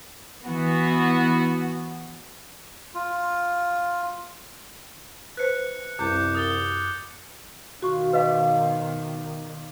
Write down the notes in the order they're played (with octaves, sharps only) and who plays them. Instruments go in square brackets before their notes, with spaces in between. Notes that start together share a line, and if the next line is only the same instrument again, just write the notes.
[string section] E3 B3 F#4
[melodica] F4
[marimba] B4 C5 [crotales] F#6 C#7
[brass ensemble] C2 [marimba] F#2 [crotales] D6 G6 C#7
[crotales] D#6 A6 G7
[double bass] B2 D#3 [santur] F4 C6 [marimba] F#4 C#6
[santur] A#3 D5 [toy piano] B4 D#5 F5
[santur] C5